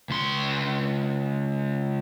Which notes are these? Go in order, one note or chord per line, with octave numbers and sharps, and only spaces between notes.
C#2 C6